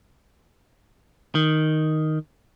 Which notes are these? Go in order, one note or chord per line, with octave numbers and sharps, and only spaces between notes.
D#3